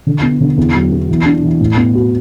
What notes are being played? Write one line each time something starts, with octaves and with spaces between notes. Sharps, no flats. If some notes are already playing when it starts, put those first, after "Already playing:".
D3
B3
D3
E2
F#3
B3
E3
D4
E3
A2
B3
F#4